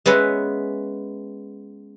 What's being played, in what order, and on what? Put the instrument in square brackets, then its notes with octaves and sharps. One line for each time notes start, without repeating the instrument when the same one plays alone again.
[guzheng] G#3 B3 C#4 B4 E5